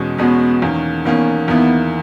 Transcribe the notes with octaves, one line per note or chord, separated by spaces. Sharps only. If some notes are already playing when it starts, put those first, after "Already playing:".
Already playing: E2 B2 G#3 C#4
E2 B2 G#3 B3 C#4
E2 D#3 A#3 C#4
E2 D#3 A#3 B3 C#4
E2 D#3 A#3 B3 E4